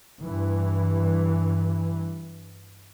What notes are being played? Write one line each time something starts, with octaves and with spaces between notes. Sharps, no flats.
G2 E3